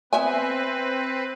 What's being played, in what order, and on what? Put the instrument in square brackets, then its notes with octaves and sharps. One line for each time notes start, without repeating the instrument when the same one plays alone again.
[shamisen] B3 E5 G#5 [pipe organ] C4 B4